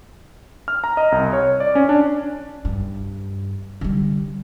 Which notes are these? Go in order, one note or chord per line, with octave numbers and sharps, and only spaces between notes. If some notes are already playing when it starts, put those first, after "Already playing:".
F6
A#5
D#5
C2
C#5
D5
C#4
D4
G2
D3 G3